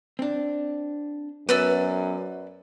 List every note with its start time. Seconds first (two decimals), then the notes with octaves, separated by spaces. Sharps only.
0.19 C4 D4
1.49 F#2 B3 B4 D5 E6